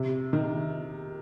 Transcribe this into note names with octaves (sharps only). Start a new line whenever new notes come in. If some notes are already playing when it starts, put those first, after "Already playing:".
Already playing: C3
D#3